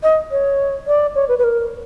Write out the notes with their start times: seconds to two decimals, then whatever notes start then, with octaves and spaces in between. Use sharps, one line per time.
0.03 D#5
0.31 C#5
0.87 D5
1.15 C#5
1.29 B4
1.39 B4
1.44 A#4